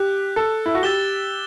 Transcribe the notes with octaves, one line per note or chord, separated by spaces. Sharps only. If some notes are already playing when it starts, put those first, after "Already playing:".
Already playing: G4 F#6
A4
E4
F#4
G4 E6 A6 E7 G7